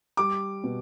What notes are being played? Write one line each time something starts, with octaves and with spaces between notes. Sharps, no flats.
G3 D6
B2